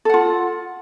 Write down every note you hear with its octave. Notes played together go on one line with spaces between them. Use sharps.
F4 A4 F#5